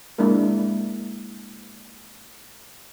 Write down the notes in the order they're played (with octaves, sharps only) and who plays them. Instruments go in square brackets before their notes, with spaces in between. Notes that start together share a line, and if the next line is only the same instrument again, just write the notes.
[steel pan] G#3 A#3 D4 E4 A#4